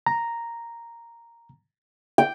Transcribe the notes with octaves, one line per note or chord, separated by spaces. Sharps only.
A#5
G5